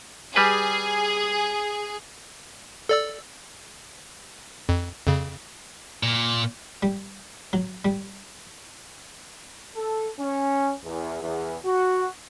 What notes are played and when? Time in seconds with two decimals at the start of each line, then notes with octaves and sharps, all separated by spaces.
0.36 G3 G#4 B4
2.89 A4 D5 E6
4.69 F2
5.06 F2 C#3
6.03 A#2
6.83 G3
7.53 F#3
7.85 G3
9.75 A4
10.19 C#4
10.85 E2
11.22 E2
11.65 F#4